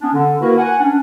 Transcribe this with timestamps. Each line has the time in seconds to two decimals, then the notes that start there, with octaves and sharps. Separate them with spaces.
0.01 B3 C#4 D4
0.14 D3
0.42 A#3 E4 F#4 A#4 B4
0.57 F#5 G#5
0.81 C#4 D4